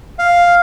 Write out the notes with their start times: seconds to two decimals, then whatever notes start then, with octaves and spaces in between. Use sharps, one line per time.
0.19 F5